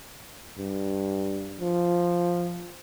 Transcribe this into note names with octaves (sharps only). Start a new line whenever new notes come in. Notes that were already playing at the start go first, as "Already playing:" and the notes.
G2
F3